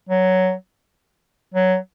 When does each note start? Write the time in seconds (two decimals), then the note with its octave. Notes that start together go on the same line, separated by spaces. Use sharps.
0.09 F#3
1.54 F#3